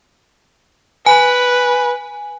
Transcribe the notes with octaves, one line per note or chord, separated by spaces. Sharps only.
B4 G#5